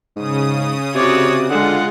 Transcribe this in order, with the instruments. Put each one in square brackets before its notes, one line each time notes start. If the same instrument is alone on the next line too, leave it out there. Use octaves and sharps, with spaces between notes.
[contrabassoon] G#2 [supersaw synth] C#3 D#6
[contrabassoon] C3 [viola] F#4 D5 [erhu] C#5
[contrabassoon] D3 [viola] G#3 [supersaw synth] F4 [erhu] F#5